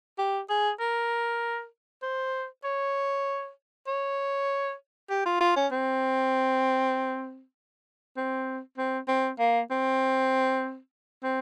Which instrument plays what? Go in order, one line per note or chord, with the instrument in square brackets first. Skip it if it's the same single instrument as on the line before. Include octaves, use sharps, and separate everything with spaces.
[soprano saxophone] G4
G#4
A#4
C5
C#5
C#5
G4
F4
F4
C#4
C4
C4
C4
C4
A#3
C4
C4